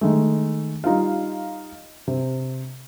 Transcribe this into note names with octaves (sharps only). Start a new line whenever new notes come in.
D#3 G#3 A3
G3 D#4 F4 F5
C3